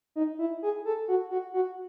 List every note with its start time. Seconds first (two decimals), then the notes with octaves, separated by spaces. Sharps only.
0.16 D#4
0.39 E4
0.62 G#4
0.85 A4
1.08 F#4
1.31 F#4
1.53 F#4